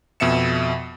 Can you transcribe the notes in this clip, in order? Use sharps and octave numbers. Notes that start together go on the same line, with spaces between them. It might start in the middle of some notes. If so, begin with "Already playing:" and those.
F2 B2 E5 C#7 E7